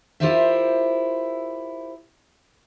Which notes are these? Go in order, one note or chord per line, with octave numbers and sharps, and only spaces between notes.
E4 F4 G4 A#4 C5 E5